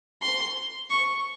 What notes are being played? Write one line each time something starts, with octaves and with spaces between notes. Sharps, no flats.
C6
C#6